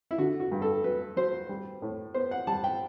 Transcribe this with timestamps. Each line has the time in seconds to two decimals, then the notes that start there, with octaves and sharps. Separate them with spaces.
0.11 E4
0.18 D3 F#4
0.40 F#4
0.52 G2
0.62 A4
0.84 F#3 B4
1.16 F#3 C5
1.49 G3
1.82 A2
2.14 B3 C5
2.31 F#5
2.47 G3 A5
2.64 G5